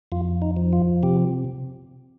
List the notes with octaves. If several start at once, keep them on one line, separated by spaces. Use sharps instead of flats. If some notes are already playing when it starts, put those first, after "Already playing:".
F2 F4
D#4
F3
F4
C3 G4